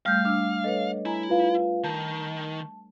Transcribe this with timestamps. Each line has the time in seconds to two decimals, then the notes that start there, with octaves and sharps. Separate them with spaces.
0.06 G3 A3 F5 F6 G6
0.25 D4 E6 F6
0.64 A4 B4 C#5 D#5
1.06 E4 G#5 A#5
1.29 F4 B4 F5
1.84 D#3 A5